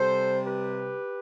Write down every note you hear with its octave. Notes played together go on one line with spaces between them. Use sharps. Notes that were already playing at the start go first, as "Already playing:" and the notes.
Already playing: C3 G3 A4 C5
G4 B4